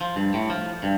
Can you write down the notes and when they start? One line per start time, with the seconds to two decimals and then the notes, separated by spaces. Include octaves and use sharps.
0.01 F3
0.16 G2
0.34 A2
0.50 F3
0.83 G2